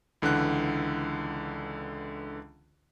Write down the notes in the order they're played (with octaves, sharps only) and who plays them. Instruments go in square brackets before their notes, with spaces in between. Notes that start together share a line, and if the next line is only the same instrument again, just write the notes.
[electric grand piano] C#2 D3 E3 F#5 F#6